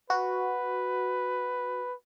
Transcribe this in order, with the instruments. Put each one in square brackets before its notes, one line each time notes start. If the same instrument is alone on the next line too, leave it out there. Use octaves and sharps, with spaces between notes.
[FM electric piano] F#4 [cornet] B4